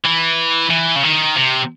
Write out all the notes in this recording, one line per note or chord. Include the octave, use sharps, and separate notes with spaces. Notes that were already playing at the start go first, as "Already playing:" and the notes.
E3
E3
C#3
D#3
C3